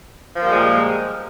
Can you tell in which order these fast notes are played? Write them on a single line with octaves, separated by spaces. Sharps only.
F3 A#3 G3 G#3 A#2